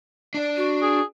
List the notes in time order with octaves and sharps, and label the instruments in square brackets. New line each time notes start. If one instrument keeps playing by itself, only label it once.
[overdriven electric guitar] D4 D5
[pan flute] F#4
[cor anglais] G#4